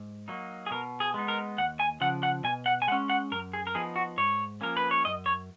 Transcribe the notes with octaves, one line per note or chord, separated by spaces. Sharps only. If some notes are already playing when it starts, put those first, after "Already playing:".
Already playing: G#2
F#3 A#3 D#4
G#4
B2 A#4
G#4
G#3 B3 D#4
A#4
D#2 F#5
G#5
C#3 F3 F#5
F#5
B2 G#5
F#5
G#5
G#3 C#4 F#5
F#5
F#2 A#4
G#4
A#4
F3 B3 D#4 G#4
F#4
G#2 C#5
F3 A#3 C#4 A#4
B4
C#5
F#2 D#5
C#5